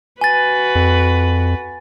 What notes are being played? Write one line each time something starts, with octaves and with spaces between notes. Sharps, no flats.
F#4 B4 G#5 A6
F2